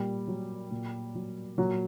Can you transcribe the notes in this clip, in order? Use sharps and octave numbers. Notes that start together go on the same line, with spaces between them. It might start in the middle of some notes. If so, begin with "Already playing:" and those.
Already playing: A#2 G3 G4
F#3
A#2
F#3
A#2 F#3 F#4